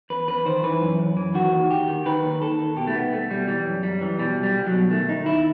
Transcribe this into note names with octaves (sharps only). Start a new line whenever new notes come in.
E2 B4
E2 B4
D#3 C5
E3 B4
F#2
F#2
E3
D#3 F#4
D#2
D#2 G4
D#3
D#3 B4
D#2
D#2 A4
D#3
B2 G4
A3
C2 B3
C2 A3
B2 G3
E3 G3
F#2
F#2 G3
E3
B2 G3
C2
G3
C2
F#3
B2
D#3 A3
D#2 D#4
D#2 E4